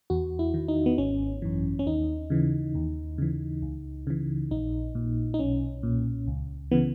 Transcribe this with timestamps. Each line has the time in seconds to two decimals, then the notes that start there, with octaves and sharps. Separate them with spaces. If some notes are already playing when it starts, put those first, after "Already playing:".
0.10 E2 F#4
0.39 E4
0.54 D#3
0.68 D#4
0.86 B3
0.98 G#1 C#4
1.42 F#2 E3
1.79 C#4
1.86 D#2 D#4
2.30 C#3 E3
2.75 D#2
3.18 C#3 E3
3.62 C#2
4.07 C#3 E3
4.51 A#1 D#4
4.95 A#2
5.34 D#4
5.39 B1 C#4
5.83 A#2
6.27 C#2
6.71 C#3 E3 B3